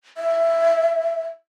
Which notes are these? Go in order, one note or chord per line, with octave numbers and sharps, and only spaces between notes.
E5